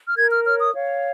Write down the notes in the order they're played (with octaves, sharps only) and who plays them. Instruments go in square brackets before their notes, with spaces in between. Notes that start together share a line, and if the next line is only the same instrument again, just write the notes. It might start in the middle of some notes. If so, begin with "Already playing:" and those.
[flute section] F6
A#4 G#6
F6
C#5 F6
D#6
C#5 F5